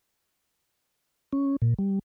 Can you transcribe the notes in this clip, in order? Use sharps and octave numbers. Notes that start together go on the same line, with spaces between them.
C#4
A#2
G3